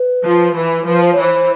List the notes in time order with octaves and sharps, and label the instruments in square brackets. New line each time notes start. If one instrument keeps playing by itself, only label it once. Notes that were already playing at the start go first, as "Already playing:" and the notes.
Already playing: [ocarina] B4
[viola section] F3
[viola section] E3 [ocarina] B4
[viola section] F3 [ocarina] B4
[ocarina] C5
C#5
[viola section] E3
[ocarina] C5